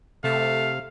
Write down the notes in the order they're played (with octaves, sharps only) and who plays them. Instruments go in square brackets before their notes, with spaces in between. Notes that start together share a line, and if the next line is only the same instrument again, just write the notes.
[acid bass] C3 [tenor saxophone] A3 [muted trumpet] F5